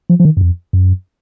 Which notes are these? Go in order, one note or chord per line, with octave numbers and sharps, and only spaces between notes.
F3
F3
D#3
F#2
F2
F#2